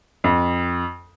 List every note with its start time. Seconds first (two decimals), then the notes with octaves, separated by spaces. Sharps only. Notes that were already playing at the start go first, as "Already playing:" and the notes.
0.24 F2